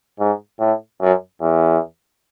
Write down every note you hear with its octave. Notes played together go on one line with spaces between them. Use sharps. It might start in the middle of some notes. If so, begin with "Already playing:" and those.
G#2
A2
F#2
E2